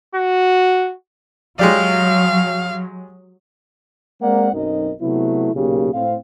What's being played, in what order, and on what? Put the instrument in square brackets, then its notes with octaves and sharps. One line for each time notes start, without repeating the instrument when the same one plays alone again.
[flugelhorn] F#4
[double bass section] F#3 [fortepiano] G#3 G4 D5 [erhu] F5
[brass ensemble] G#3 A#3 C4 A#4 D5 F#5
B1 F#2 C4 D#4 A#4 D#5
C3 F#3 A3 B3 E4
B1 A#2 C#3 A#3 G4
A2 C4 F5